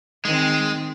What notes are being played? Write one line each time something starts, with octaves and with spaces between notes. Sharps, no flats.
D#3 G#3 C4